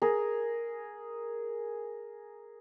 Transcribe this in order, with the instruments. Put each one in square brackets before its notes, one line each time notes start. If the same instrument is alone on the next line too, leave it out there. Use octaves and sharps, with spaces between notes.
[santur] G#4 A#4